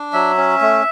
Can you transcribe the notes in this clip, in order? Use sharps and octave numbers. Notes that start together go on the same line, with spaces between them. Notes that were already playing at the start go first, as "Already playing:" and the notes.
Already playing: D4
F#3 E5
C#4
A3